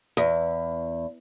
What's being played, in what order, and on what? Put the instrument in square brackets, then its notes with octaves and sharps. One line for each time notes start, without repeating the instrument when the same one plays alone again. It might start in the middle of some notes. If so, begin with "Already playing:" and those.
[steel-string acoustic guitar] E2